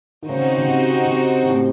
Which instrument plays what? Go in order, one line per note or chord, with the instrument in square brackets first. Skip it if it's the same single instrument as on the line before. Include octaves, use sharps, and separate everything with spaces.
[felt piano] D#3
[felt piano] C#3 [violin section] C4 D#4 F#4 C5
[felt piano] C#3
C3
C3
C3
A2